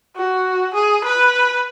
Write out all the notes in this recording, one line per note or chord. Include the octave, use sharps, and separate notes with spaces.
F#4
G#4
B4